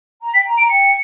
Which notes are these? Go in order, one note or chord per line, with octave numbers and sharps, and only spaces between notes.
A#5
G5 B6
A#5
A#5 D7
G5 C#7